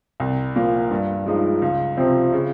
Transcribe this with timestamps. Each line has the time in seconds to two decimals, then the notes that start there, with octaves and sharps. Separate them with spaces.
0.20 C2
0.55 A#2 F3 A#3
0.91 G2
1.26 F3 G#3 D#4
1.62 C#2
1.97 C3 F3 C4
2.33 C#3